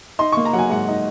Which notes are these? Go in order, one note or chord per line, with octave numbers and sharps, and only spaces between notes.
D#4 C6
C#6
A#3
A#5
F#3 F#5
G#5
G#2 F#5
D#4